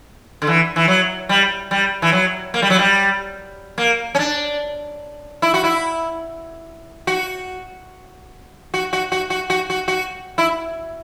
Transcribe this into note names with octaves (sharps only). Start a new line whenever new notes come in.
D3
E3
E3
F#3
G3
G3
E3
F#3
A#3
G3
F#3
G3
A#3
C#4
D4
E4
F#4
E4
F#4
F#4
F#4
F#4
F#4
F#4
F#4
F#4
E4